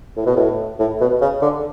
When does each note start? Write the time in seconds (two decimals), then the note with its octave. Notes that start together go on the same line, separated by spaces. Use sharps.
0.17 A2
0.26 B2
0.36 A2
0.79 A2
1.01 B2
1.21 C#3
1.42 D3